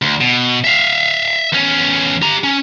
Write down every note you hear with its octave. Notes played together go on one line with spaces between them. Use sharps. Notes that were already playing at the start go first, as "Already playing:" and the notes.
D2
B2
E5 F5
E2 C#4
G4 A#5
C#4